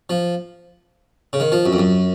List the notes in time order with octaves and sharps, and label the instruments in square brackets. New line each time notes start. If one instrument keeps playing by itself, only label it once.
[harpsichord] F3
C#3
D#3
F3
F#2
F2
F#2